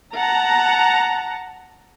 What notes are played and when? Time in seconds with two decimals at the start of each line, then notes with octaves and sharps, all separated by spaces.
0.13 F#5 A5 A#5